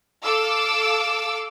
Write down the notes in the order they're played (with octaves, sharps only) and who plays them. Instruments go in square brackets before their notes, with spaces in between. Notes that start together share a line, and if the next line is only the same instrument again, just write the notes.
[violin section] A4 F5 D6 E6